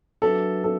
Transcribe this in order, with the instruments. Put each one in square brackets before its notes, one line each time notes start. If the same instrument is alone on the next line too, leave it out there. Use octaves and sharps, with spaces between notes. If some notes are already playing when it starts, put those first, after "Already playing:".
[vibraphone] F#3 D4 F#4 B4 E5 [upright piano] A4
[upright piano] A4